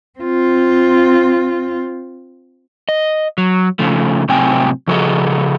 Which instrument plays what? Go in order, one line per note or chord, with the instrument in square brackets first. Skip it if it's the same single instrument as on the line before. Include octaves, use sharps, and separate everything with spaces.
[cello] C4 F4
[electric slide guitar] D#5
F#3
C#3 F3 A3
A2 C3 F#3 C4 G5 G#5
C#3 F3 F#4 G#4 A4 D#5